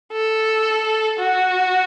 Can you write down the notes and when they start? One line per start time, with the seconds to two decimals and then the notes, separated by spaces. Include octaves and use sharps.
0.13 A4
1.19 F#4